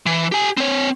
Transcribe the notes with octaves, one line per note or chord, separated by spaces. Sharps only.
E3
G4 G#5
C4 C#5